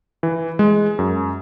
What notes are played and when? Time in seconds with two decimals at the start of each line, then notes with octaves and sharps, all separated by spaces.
0.23 E3
0.59 G#3
0.99 F#2